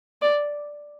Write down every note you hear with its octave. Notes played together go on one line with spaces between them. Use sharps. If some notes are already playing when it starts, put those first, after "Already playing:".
D5